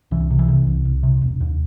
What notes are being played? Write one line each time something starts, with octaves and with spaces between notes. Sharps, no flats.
C2 E3
C3
E3
C3
C2
C2
C3
E1
D#2